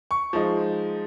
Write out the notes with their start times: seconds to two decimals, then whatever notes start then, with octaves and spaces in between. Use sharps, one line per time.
0.11 C#6
0.33 F3 G#3 D#4